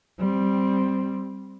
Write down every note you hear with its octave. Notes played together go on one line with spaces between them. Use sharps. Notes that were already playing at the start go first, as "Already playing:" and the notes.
G3 C4